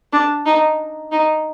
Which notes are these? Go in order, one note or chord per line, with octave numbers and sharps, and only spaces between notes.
D4
D#4
D#4